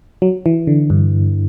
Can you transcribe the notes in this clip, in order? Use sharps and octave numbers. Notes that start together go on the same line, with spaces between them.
F#3
E3
D3
G2